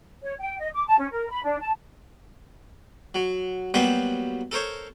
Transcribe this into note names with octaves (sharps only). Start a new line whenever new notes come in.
C#5
G5
D#5
D6
A5
C#4
A#4
B5
D4
A5
F#3
F#3 G3 A#3 B3 B4 C5
A4 A#4 C5 C#5